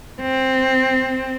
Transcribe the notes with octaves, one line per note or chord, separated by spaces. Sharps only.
C4